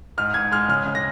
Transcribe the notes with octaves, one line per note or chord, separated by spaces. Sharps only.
G#2 F6
G#2 G#6
G#3 F6
C#3 F6
C#3
A#6